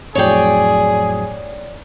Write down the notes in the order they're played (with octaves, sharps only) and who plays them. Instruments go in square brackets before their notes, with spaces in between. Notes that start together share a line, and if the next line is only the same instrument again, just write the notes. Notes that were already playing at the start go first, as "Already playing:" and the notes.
[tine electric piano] F2 A2 F#3 [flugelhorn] G#4 [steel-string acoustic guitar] C#5 D5 G5